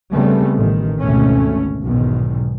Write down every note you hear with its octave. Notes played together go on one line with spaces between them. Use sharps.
C#3 G3 A3 B3 C4
A1 D#3
G#1 D2 B2 A3 C#4
B1 E2 G#2 B2 D#3